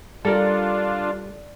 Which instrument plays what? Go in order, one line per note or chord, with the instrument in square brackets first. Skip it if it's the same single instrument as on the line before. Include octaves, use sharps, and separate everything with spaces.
[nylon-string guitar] G3 [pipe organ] D4 F4 [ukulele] A4 A#4 D5